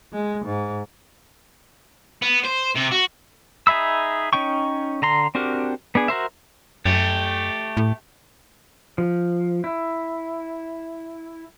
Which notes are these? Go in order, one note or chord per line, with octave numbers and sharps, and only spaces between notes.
G#3
G#2
B3
C5
C3
F#4
D#4 G#4 E5 B5 E6
C#4 D#4 G5 C#6
D3 A#5 C6
C4 D4 F#4 G4 A#4
B3 D4 G#4
F#4 A#4 C5 E5
F#2 A3 G4
A2
F3
E4